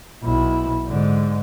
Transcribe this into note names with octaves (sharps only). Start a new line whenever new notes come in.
B1 E4
G#2 D3